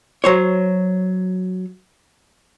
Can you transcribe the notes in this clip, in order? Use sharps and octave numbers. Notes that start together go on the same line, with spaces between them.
F#3 C5 C#5